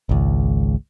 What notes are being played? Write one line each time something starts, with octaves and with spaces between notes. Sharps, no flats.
G#1 C#2